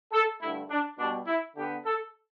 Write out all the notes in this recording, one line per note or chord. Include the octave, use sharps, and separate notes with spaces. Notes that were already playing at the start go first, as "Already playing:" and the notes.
A4
G2 D3 A3 E4
D4
B2 G3 B3 D4
E4
D3 B3 G4
A4